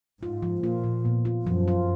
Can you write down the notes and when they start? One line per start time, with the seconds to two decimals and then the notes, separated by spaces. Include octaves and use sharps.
0.22 G#2 F4
0.42 F3
0.63 A#2 F4
0.84 F3
1.05 B3
1.25 F4
1.46 F#2 F3
1.68 F4